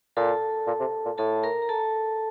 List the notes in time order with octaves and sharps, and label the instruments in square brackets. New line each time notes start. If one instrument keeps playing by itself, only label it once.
[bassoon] A#2 [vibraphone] A4 A5
[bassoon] A#2
C3
A#2
[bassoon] A2 [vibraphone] A4 A5
[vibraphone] A#4 A#5
A#5
A4 A5